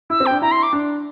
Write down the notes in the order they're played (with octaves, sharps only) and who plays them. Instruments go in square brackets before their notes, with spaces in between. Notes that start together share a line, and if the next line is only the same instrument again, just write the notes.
[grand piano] E4 [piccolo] E6
[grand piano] C4
[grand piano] D4 [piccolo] G5
[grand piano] E4 [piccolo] A#5
[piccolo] C6
D6
[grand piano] D4